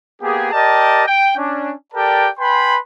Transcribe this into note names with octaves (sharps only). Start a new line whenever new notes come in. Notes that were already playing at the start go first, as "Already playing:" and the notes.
A#3 B3 G4 G#4
G4 A#4 D5 D#5 G5 A5
G5
C#4 D4
G4 A4 A#4 D5 G5 A5
B4 G5 G#5 B5 C6